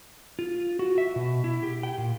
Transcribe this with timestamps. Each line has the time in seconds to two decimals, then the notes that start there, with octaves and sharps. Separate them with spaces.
0.39 F4
0.79 F#4
0.98 E5
1.16 B2
1.44 E4
1.63 G4
1.83 G5
1.98 A#2